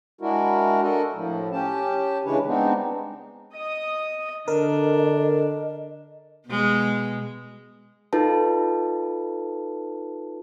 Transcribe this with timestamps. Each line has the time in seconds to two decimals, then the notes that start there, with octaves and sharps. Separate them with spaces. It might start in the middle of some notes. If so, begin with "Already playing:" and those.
0.21 G#3 D4 E4 F#4 A#4
0.82 D4 F#4 A4 A#4 D#5
1.14 A2 F3
1.52 C#4 G4 A5
2.25 C#3 E3 G#3 D4 B4 C#5
2.46 G#3 B3 C4 D4 D#4
3.54 D#5 D#6
4.48 D3 D4 A#4 D#5
6.48 B2 G#3
8.13 D#4 F4 A4 B4 A5